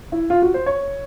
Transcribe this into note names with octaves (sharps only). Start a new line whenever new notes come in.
E4
F4
F#4
C5
C#5